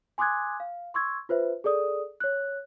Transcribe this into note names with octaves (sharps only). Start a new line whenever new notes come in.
G#5 C6 D6 D#6 F#6 G#6
F5
C6 C#6 E6 G#6
F4 B4 C5 E5
G#4 A4 D5 D#6
C#5 F#6